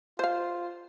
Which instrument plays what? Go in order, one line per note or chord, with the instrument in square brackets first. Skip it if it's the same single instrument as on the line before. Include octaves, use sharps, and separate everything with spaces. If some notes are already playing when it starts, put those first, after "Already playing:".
[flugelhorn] F4 [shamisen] C5 F5